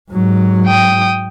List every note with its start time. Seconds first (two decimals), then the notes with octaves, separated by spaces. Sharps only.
0.11 G#2 F#3
0.67 G5 D#6